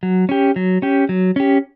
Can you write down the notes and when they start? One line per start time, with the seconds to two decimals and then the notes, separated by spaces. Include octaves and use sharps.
0.03 F#3
0.29 C#4 G4
0.56 F#3
0.82 C#4 G4
1.09 F#3
1.36 C#4 G4